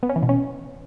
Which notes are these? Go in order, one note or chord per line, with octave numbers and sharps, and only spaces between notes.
B3
C#4
E3
B2
C#4